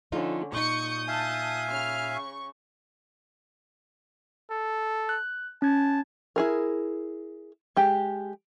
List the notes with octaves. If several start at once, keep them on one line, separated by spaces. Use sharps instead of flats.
D3 F3 C#4 D#4 F4
A#2 D#4 C#6 D#6 G6 C#7
E5 F5 G#5 A5
C#3 F6
C#6
A4
F#6
C#4 A5 G#6
E4 G#4 A#4
G#3 G4